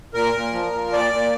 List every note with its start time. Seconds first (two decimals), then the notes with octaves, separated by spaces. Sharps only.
0.14 A#2 A#4
0.34 A#2
0.53 F3
0.72 F3
0.93 A#2 D5
1.12 A#2